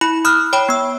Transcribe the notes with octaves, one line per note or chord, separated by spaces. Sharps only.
E4 B5
B5 D#6 F6 F#6
C#5 G5 B5
B3 E6